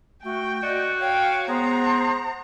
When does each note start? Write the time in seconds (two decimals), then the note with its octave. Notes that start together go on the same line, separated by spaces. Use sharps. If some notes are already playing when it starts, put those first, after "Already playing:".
0.24 A3 F#4 G5
0.63 F#4 D5 D#5
1.01 C#5 F5 G5
1.48 G#3 B3 C5 A#5